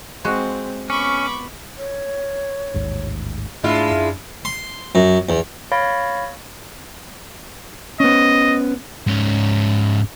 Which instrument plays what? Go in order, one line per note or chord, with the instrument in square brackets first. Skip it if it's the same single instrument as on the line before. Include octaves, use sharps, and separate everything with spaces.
[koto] G#3 F#4 [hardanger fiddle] C4
[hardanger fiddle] B3 [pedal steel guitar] C#4 [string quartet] B5 C#6 D6
[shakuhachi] C#5
[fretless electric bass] A1 D#2 G#2
[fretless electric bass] G#2 A3 [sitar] G#3 E4 F4 [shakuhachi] D4
[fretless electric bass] F#2
[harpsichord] C6
F#2
E2
[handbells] C#5 F5 B5 C#6 A6 A#6
[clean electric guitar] B3 C#4 [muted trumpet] D#5
[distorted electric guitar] G#2 C#4